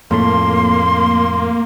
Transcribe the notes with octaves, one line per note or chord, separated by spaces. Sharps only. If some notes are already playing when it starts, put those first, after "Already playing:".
F2 A2 A3 A#3 C6